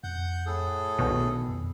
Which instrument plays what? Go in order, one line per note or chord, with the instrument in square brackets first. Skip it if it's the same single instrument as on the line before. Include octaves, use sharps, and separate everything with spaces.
[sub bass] F2 [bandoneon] F#5 G6
[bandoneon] A2 G#4 A4
[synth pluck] B1 B2 [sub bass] D#3
[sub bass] F2